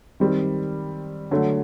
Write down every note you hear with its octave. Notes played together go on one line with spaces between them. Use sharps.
D#3 G3 C4
D3 F#3 A3